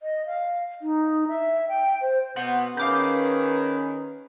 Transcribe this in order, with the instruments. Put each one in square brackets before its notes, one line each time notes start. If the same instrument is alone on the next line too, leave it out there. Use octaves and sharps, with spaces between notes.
[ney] D#5
F5
D#4
E5
G5
C5
[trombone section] B2 B3 [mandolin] C4 F#5 G6
[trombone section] D#3 G#4 A#4 [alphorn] C#4 [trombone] B4 [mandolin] F5 D6 G6